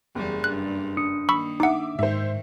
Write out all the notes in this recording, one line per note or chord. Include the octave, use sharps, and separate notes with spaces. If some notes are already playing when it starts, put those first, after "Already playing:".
F#1 E2 G3 G#4
G2 F#6
D4 D#6 C#7
D#3 A#3 B5 C#6 E6
D#4 E5 F#5 D6
G#2 D#3 C5 E5